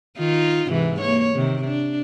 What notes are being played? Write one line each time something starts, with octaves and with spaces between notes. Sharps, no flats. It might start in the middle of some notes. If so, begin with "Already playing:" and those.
D#3 D#4 F4
G#2 C3 E3
A#3 C#5
C3 D#3
D4